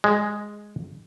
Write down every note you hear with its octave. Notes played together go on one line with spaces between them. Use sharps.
G#3